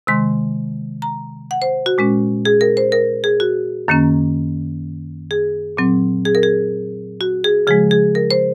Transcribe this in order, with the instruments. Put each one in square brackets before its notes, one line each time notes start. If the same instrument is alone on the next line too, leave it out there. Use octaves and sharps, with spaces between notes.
[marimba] C3 D#3 G#3 C6
A#5
F#5
C5
F#4
A#2 G#3 C#4
G#4
A#4
C5
A#4
G#4
F#4
F#2 D#3 A#3 C#4
G#4
A#2 F#3 C4
G#4
A#4
G#4
F#4
G#4
C#3 F3 G#3 G#4
G#4
A#4
C5